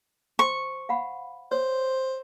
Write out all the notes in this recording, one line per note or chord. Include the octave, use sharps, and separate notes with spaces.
C5 C6 C#6
F5 F#5 B5
C5 C#5